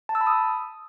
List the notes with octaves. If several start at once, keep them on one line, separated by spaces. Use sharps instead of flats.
A5
E6
B5
D#6